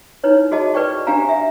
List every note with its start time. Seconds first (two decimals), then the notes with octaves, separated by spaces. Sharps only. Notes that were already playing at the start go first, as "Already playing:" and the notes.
0.24 D#4 E4 B4 C#5
0.51 F#4 G#4 D#5 A5
0.74 G#4 B4 D5 G5 C#6
1.07 D4 G4 F5 G#5 A#5
1.29 E5